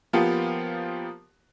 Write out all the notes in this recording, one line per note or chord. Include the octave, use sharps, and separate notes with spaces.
F3 A#3 B3 F4 G4